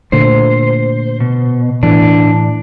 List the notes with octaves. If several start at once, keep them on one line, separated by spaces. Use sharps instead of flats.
A#2 D3 A3 C5
B2
A2 E3 D4